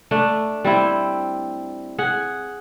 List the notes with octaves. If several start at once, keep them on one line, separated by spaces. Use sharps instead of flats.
A3 D4
G3 C4 E4
G#4 F#5